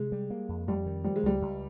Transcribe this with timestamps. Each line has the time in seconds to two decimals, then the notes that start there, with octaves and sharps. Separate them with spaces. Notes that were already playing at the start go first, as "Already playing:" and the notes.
Already playing: C3 G#3
0.12 G3
0.30 A#3
0.49 F2
0.68 F2 G3
0.86 D#3
1.04 F3 G3
1.16 G#3
1.23 C#2 G3
1.41 C#2